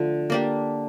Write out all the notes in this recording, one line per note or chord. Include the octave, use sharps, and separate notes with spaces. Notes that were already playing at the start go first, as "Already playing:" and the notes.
Already playing: D3 F3 A3
A#3 D4 G4